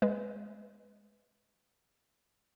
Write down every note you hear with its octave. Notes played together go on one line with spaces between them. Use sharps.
G#3 B4